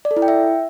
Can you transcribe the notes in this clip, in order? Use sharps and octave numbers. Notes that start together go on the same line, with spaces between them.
D5
A4
E4
G5
E5